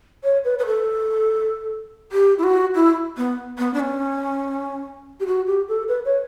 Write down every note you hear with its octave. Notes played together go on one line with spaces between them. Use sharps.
C#5
B4
B4
A4
G4
E4
F#4
E4
B3
B3
D4
C#4
G4
F#4
G4
A4
B4
C#5